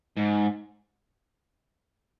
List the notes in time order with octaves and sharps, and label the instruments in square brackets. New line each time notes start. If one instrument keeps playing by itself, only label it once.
[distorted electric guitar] G#2